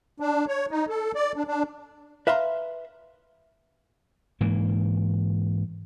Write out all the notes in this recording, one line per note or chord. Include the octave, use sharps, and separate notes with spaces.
D4
C#5
D#4
A4
D5
D4
D4
B4 E5 F5 A#5 C6
G#2 E3 A#3